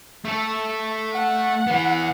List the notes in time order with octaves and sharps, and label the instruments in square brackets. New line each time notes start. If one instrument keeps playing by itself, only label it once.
[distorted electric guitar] A3 A4
[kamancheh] F#5
[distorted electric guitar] E3 B3